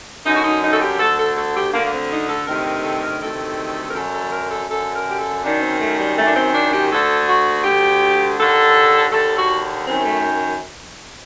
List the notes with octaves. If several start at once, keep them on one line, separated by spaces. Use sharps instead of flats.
F#2 D3 D#4
F#4
D#4
D#4
A4
G4
D2 D3 A4
A4
A4
G4
D3 A#3
D2
A#3
C4
D#4
A4
D2 C3 D#3 A#4
A#4
A4
A#4
D2 C3 D#3 A4
A#4
F#2 D3 A4
A4
A#4
A4
F#2 D3 A4
A#4
G4
A4
F#2 D#3 D4
C4
A3
G3
F#2 D#3 A3
D4
C4
D4
G4
D2 D3 A4
F#4
D2 D3 G4
D#2 D3 A4
D#2 D3 A4
F#4
F#2 D#3 C4
A3